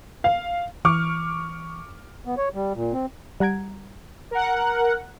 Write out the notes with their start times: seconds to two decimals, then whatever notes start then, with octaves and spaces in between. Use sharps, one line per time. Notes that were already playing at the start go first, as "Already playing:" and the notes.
0.24 F5
0.85 E3 C#6 D6 F6
2.25 B3
2.37 C#5
2.54 G3
2.75 A#2
2.93 C4
3.40 G3 F#5 A#5 G#6 D7
4.31 A#4 F#5